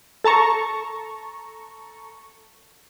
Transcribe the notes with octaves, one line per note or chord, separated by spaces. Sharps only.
A4 A5 A#5 C#6